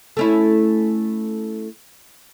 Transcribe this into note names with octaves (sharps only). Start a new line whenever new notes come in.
A3 C#4 E4